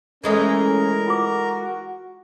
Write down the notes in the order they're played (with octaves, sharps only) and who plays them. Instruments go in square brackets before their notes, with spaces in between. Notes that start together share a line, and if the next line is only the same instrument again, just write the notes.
[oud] E3 G#3 A3 [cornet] C#4 [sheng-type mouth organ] A#4
[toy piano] F4 D6 [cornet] F#4